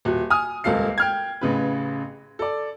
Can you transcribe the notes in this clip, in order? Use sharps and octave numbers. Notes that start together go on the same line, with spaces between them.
D#1 F#4
G#5 D#6 F6
D#1 C#2 A#3 A4 F5 C7
G5 F6 G#6
A1 C#3 B4
A4 D5